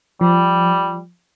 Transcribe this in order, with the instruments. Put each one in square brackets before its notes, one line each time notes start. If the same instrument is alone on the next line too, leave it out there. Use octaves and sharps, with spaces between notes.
[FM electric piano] F3 [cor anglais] G3